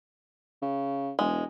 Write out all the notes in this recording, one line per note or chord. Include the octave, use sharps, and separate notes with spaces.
C#3
E1 G#3